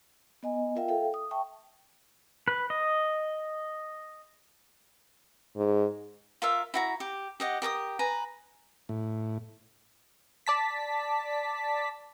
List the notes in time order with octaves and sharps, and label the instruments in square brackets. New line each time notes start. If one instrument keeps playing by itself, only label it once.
[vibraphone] B3 D#5 G#5
F4 A#4 E5 F5 G5
A4 E5 F5 G5
D#6
E5 G5 A5 C#6
[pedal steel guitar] B4
D#5
[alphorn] G#2
[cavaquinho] F4 A#4 E5
E4 F#4 A#5
G4
G4 D#5 F#5
G4 A#4 D6 D#6
B4 G#5 A#5
[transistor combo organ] A2
[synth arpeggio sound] D5 A5 B6